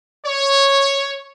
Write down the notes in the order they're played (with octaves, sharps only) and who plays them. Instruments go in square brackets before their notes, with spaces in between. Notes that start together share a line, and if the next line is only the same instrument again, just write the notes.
[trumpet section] C#5